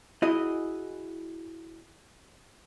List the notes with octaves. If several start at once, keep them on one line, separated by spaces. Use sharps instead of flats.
E4 F#4 G#4 D#5